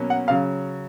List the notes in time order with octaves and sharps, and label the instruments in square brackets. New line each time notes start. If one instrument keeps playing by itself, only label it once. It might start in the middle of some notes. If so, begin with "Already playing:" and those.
Already playing: [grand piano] B2 F#3 A#3 C#4
F#5
C#3 F#3 F5